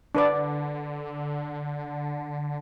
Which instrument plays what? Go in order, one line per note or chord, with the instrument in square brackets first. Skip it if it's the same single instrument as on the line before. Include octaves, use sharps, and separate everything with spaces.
[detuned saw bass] D3 [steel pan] D4 B4 D5